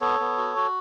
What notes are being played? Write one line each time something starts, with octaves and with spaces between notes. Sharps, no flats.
B3 A4 C#5
B3
F#4
F#4